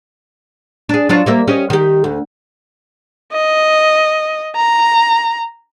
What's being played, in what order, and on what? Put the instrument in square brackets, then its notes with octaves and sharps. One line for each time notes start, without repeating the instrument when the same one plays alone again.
[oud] D4 G#4
F#3 D4 F4
G3 A#3 E5
C#4 G4 D#5
D#3 G4
D2
[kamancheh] D#5
A#5